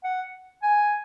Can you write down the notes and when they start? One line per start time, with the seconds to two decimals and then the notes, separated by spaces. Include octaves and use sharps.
0.04 F#5
0.63 G#5